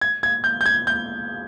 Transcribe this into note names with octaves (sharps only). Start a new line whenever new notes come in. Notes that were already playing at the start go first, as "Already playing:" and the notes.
G#6
G#6
G6
G6
G#6
G6